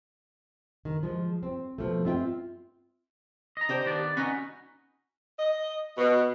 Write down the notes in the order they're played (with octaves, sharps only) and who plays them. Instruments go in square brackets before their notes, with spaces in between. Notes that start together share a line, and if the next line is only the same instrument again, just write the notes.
[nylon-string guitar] D#3
F3 G#3
C4
B2 F3 A3
C4 F4 E5 F#5 G5
[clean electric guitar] D#5 A#5
[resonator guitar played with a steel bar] D4 G4 C5
[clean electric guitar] D#3 B3 D5
[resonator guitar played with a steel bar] C#4 [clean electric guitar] D#4 F#4 B4
[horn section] D#5
B2